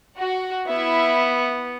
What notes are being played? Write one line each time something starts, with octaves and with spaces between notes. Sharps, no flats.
F#4 F#5
B3 E4 E5